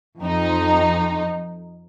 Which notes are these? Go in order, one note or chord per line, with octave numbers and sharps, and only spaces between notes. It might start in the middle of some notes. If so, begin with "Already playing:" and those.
F2 D#4